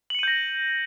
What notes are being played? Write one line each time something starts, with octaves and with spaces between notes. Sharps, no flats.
G6 A#6 C#7 D#7 F#7